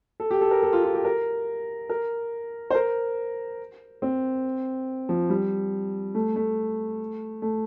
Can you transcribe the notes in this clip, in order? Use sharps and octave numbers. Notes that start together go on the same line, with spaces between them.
A4
G4
A4
A#4
A4
F4
F4
G4
A#4
A#4
C5
A#4
C4
F3
G3
A3
A3
A3